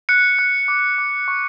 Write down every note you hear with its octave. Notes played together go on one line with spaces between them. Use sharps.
F#6 C#7
F#6
D6
D6
C#6